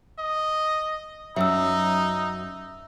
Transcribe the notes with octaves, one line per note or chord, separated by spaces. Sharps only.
D#5
F#2 F#3 D#4 E5 E6